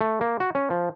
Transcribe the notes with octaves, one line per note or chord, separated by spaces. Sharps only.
A3
A#3
F#4
C#4
F3